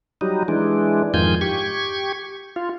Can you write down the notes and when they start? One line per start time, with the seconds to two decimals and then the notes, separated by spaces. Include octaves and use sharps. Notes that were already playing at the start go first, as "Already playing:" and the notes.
0.21 F#3 G3 D#4
0.48 E3 G#3 D4
1.14 F2 G#2 D#3 F4 G#5 G6
1.41 G4 C#6 G#6
2.56 F4